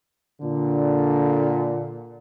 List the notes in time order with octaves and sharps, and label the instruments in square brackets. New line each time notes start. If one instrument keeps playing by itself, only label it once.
[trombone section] A#2 D3